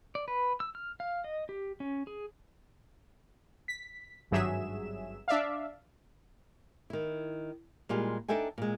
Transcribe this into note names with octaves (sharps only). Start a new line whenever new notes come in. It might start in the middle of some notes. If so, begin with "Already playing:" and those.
D5
B4
E6
F6
F5
D#5
G4
C#4
G#4
B6
G#1 G2 F#3 G#4 E5 E7
D4 D5 E5 F5
D#3 E4
A#2 G3 G#3 F4
D4 D#4 A4 E5 G5 G#5
A#2 G#3